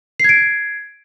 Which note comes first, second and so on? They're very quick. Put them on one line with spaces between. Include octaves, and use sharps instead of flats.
C7 G#6 D7